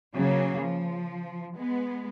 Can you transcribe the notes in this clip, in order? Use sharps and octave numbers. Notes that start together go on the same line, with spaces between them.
C#3 F#3 A#3
F3
G#3 B3